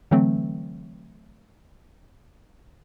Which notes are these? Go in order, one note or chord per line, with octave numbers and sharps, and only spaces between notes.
D3 E3 F#3 A3 C4